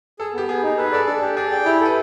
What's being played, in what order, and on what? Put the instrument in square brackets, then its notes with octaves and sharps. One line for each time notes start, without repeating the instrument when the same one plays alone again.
[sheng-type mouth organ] G#4 [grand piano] A4
[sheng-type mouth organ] B3 [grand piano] G4
[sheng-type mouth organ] B3 [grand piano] G#4
[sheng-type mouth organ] D#4
[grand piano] A4 [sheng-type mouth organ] B4
[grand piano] G#4
[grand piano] A4 [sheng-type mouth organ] D5
[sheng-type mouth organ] D4 [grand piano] A4
[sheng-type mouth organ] G4
[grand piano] G#4 [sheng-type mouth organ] D5
[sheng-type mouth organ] G5
[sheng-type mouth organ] E4 [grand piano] G4
[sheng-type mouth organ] A4 [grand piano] B4